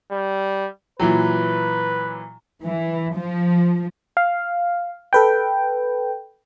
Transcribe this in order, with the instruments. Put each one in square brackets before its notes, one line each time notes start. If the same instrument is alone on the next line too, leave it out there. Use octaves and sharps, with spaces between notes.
[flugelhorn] G3
[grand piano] A#2 E3 F#3 [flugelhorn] B4
[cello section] E3
F3
[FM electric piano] F5
A4 B4 G5